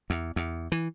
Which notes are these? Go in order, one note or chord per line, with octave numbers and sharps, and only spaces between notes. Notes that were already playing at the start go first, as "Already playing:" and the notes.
E2
E2
E3